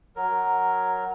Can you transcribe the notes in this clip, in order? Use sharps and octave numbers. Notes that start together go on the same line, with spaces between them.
F#3 A#4